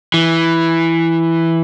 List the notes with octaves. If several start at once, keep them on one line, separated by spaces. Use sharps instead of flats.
E3